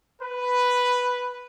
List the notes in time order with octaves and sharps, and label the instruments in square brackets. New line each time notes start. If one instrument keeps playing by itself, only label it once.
[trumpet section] B4